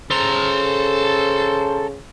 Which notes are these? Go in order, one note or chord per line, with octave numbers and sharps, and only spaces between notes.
C#3 A4 C5 A#5